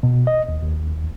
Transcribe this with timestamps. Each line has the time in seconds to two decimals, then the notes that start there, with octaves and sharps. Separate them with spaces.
0.03 B2
0.27 D#5
0.49 D#2
0.63 D#2